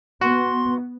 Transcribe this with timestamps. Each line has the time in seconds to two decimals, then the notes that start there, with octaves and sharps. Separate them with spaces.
0.21 B3 F#4 C6